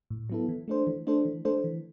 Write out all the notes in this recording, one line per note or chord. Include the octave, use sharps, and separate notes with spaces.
A2
F#3 B3 E4 A4
E3
A3 D4 A4 C5
E3
A3 D4 A4 C5
E3
A3 D4 A4 C5
E3